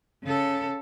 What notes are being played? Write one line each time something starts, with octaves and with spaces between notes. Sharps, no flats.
C#3 A4